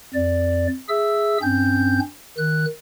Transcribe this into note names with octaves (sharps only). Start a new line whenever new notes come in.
F2 D5
G#4 E5 E6
G2 C4 C#4 G6
D#3 F#6